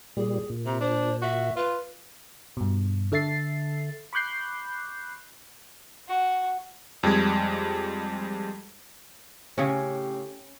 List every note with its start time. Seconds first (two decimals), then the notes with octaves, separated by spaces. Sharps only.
0.17 A#2 G3 G#4
0.50 A#2
0.66 C3 A#5
0.80 D4 C5
1.22 F#4 E5
1.57 F4 B4
2.57 G2 B2
3.12 D3 A4 E5 A6 C7
4.13 B5 C#6 D6 F#6 G6 C7
6.08 F#4
7.03 F2 G3 G#3 G#6
9.58 A2 C#3 C#4 G4